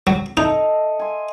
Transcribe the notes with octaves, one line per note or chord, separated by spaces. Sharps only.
F#3
D#4 A4 D#5 E5
G#5 C6